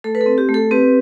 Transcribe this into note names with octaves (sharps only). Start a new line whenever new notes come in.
A3 A4
B4
A4
C4
G4
A3
A4
C4 G4 B4